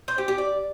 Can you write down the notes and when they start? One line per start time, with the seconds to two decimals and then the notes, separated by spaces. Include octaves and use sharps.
0.08 C5
0.18 G4
0.28 G4
0.38 D5